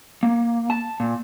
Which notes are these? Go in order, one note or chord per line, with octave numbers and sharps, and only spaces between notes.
A#3
A5
A#2